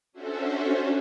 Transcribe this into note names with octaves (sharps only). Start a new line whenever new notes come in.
C#4 D4 F#4 A4 C5 E5